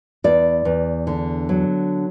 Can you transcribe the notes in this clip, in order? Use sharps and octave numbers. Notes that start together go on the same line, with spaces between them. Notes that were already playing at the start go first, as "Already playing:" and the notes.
E2 D5
E2
D3
F#3